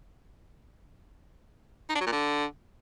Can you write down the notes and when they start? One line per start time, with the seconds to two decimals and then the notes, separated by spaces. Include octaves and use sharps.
1.90 D#4
1.95 D4
2.01 F#3
2.07 A#2
2.12 D3